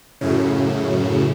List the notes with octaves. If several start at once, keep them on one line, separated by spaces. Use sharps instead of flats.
F#2 A2 C#3